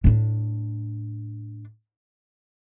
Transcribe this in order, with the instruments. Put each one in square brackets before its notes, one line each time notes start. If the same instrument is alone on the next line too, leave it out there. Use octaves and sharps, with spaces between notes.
[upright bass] A2 D4